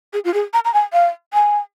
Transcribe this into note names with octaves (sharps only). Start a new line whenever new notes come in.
G#4
F4
G#4
A#5
A#5
G#5
F5
G#5